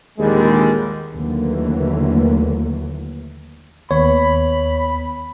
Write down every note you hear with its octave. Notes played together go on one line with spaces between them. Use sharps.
A#1 D#2 D3 G3 G#3
D#2 D3 E3 F#3 A3 A#3
D#2 B3 C#5 B5